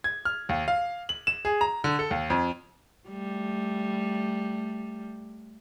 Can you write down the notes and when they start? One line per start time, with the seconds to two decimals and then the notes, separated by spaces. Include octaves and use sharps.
0.04 G#6
0.25 F6
0.49 D#2
0.68 F5
1.09 F#7
1.27 E7
1.45 G#4
1.61 A#5
1.84 D3
1.99 A4
2.11 D#2
2.30 F2
3.09 G3 A3